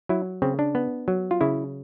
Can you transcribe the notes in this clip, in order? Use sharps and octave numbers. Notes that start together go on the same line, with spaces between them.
F#3 E4
C#3 C4
D4
B3
F#3
F4
C#3 E4